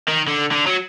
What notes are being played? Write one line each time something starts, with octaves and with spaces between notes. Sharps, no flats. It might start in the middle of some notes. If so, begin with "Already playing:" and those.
D#3
D3
D3
F#3